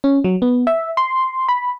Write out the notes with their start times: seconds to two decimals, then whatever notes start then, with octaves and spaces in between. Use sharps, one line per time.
0.04 C#4
0.24 F#3
0.42 B3
0.67 E5
0.97 C6
1.48 B5